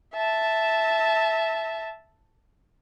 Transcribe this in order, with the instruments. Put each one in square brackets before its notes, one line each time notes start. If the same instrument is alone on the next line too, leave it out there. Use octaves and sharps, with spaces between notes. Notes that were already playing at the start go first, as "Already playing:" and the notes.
[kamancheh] E5 A5